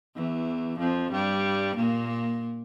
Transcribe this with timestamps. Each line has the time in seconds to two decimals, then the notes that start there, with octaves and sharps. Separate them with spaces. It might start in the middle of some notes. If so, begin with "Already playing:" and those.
0.15 E2 E3
0.79 F2 F3
1.12 G2 G3
1.76 A#2 A#3